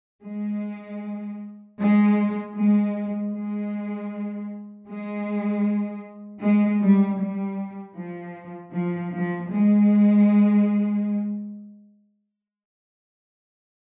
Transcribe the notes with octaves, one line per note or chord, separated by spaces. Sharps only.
G#3
G#3
G#3
G#3
G#3
G#3
G3
G3
F3
F3
F3
G#3